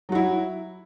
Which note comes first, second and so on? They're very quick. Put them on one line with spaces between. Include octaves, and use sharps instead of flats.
F#3 F#4 E4